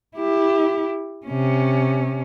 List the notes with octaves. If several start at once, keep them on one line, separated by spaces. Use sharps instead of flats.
E4 G4
C3 C#4